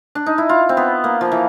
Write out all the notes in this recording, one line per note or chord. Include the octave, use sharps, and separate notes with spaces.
D4
D#4
E4
F4
C4
B3
A#3
F3
E3